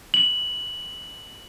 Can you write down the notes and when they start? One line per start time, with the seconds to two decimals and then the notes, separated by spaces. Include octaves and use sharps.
0.14 F#7